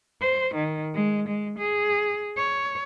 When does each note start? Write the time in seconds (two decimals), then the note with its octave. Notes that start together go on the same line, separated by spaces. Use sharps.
0.21 C5
0.55 D#3
0.94 G#3
1.28 G#3
1.59 G#4
2.37 C#5